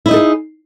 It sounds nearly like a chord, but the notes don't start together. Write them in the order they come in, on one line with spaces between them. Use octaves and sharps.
E4 D#5 D#4 A4 G#4